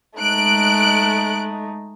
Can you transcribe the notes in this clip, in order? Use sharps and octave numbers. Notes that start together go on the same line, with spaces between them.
G#3 A3 D#4 F#6 D7